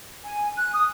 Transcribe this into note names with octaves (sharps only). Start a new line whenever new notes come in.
G#5
F#6
D#6